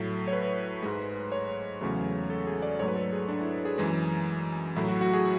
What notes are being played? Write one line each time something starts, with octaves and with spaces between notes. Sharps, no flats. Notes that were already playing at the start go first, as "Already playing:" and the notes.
Already playing: A2 F#3 A3 A4
C#5
B4
G#2 G#3
C#5
E2 C#3 F#3 A3
A4
G#4
D5
G#2 F#3 A3 C#5
B4
A4
G#4
D4
E4
G#4
F#2 E3 G#3
A2 F#3 A3 E4
F#4
F#4
G#4